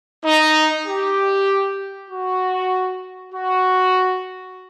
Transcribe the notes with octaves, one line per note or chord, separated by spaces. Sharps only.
D#4
G4
F#4
F#4